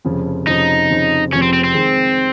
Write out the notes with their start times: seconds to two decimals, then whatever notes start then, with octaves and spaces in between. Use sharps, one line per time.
0.05 F1 F2 C#3 F3
0.47 F1 F2 C#3 F3 D#4
0.89 F1 F2 C#3 F3
1.32 F1 F2 C#3 F3 C#4
1.42 C4
1.53 C4
1.64 C4
1.74 F2 C3 D#3 G#3 D#4